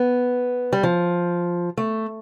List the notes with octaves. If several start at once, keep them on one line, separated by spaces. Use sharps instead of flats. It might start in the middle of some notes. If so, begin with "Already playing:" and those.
Already playing: B3
G3
F3
A3